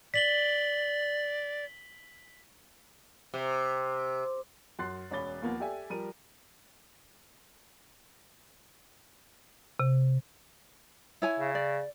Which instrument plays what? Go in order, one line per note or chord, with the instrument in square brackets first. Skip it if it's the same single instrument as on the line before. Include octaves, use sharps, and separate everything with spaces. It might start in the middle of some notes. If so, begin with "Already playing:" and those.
[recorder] D5 [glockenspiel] B6 F#7 G7
[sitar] C3
[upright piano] F#2 C6 F#6 A6 C7
E1 C#4 B5 D6 A6 G7
D#2 F3 A#3 B3
G4 A4 D5 E5 G#5
F3 G3 A#4 A#5 D#7
[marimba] C3
[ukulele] E4 C#5 G#5
[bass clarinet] C#3
[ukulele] D5